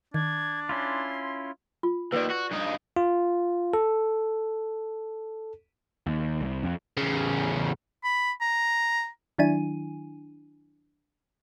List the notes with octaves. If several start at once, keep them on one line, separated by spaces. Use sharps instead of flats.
D#3 D4 G#6
C#4 E4 F4 C6
F4
D#2 D#3 B4 D5
F#4
G2 D#4
F4
A4
D#2
C2
F2
E2 C#3
B5
A#5
D#3 F#3 D4 E4 G#5 D#7